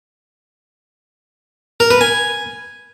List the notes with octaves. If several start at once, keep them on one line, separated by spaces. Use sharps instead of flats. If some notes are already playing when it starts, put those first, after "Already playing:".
A#4
B4
G#5